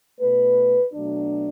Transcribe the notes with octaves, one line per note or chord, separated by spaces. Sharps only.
B2 A3 B4
B2 F#3 A3 D4